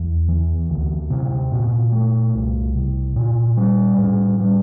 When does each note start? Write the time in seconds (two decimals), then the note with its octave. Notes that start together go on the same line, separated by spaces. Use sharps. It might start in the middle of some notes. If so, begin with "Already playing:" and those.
Already playing: E2
0.29 E3
0.70 D2
1.10 C3
1.52 A#2
1.92 A3
2.34 C2
2.75 C3
3.16 A#2
3.57 G3
3.98 A2
4.40 G3